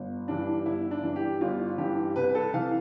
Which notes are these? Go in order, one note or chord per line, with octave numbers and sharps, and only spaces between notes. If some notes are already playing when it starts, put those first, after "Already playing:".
Already playing: G1
G2 E3 D4
G1 E4
D4
G2 E3
G4
G1 F4
G2 E3 G4
C2 B4
A4
C3 E3 F5